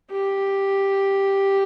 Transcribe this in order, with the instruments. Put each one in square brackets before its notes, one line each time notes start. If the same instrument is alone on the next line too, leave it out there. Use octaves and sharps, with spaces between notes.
[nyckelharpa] G4